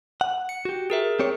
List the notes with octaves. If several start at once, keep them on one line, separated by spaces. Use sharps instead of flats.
F#5
C#7
F#4 G4
G#4 A#4 E5
C4 G4 C#5